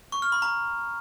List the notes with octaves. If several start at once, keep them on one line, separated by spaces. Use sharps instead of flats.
C#6
F6
B5
A#5